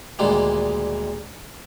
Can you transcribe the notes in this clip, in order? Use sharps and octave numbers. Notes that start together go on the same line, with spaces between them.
D2 A#2 D#3 G3 G#3 A#3